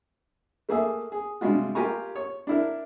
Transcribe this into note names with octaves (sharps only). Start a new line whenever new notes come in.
A3 A#3 G#4 E5
G#4
G2 C3 G3 G#3 F4 F#4
F4 G4 A#4 G#5 A#5 C#6
C#5
D4 E4 A#4